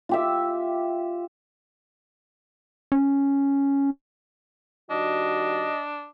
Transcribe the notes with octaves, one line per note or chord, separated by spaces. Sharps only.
F4 G4 E5
C#4
D#3 G3 D4 F#4 D#5